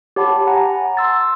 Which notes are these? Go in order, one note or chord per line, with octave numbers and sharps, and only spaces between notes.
G4 C#5 F#5 A5 B5 D6
F#5 G#5 A#5
C6 E6 A6